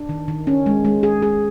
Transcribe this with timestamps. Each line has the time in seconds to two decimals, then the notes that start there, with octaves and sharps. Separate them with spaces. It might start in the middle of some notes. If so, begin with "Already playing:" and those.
Already playing: D4
0.09 D#3
0.28 D#3
0.47 C#4
0.66 G#3
0.85 G#3
1.03 G#4
1.22 G#4